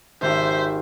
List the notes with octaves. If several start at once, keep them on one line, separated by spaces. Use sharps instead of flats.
G#1 G4 C5 E5